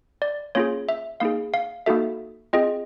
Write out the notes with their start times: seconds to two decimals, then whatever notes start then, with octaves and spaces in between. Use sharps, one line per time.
0.22 D5
0.55 A#3 C#4 F4 G#4 C#5
0.89 E5
1.20 A#3 D#4 G#4 F5
1.54 F5
1.86 A#3 D#4 F#4 A4 E5
2.53 C4 F4 G#4 D#5